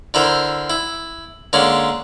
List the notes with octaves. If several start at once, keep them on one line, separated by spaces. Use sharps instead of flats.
D3 E4 A#4 C5
E4
D3 G#3 A#3 C#4